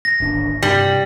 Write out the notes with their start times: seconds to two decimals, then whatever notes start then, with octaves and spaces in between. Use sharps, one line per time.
0.05 A#6
0.20 D1 G#1 D4
0.63 G2 C3 G3